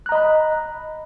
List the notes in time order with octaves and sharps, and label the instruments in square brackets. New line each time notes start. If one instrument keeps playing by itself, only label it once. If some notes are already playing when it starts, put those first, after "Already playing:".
[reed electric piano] F#6
A#5
D#5
B5